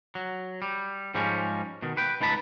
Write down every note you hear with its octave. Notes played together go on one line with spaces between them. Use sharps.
F#3
G3
G#2 F3 G3 G#3 C#4
B2 D#3
B4 G5
C#2 D#4 B4 A5 B5